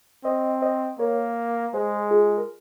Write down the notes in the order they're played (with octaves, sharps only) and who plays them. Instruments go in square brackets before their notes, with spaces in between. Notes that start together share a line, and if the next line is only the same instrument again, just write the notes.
[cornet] C4 [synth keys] C5 D#5
[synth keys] C5 D#5
[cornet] A#3 [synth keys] A#4 C#5
[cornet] G#3 [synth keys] G#4 C5
[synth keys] F4 G#4
A#4